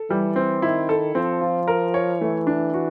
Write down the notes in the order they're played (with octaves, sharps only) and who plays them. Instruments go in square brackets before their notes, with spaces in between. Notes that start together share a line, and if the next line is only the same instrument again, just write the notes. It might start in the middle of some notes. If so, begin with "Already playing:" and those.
Already playing: [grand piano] A4
[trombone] E3 [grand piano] G3
[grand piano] C4
[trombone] D#3 [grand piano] E4
[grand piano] A4
[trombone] F3 [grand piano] C4
[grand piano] F4
A#4
C#5
[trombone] E3 [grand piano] A3
[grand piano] D4
F#4